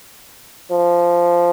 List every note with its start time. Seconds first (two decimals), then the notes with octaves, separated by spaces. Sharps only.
0.71 F3